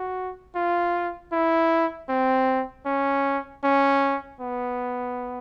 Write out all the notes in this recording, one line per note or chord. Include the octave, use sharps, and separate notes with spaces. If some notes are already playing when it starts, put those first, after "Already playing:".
Already playing: F#4
F4
E4
C4
C#4
C#4
B3